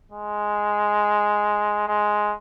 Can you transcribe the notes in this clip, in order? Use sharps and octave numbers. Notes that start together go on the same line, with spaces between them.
G#3
G#3